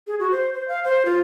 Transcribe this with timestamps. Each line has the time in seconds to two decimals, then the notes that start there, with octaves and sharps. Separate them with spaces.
0.07 G#4
0.20 F#4
0.31 C5
0.53 C5
0.68 F5
0.84 C5
1.05 F4